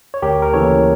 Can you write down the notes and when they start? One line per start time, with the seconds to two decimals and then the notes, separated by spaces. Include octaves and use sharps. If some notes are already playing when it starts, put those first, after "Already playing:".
0.14 C#5
0.22 D2 G4 A#4
0.42 A#4
0.53 C#3 E3 A#3 A4 C#5